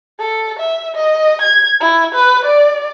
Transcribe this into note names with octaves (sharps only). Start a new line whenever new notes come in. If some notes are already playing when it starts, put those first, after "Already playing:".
A4
E5
D#5
G#6
E4
B4
D5